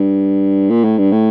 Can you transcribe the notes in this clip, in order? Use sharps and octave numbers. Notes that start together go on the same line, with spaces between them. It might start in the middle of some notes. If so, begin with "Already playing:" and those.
Already playing: G2
A#2
A2
G2
A2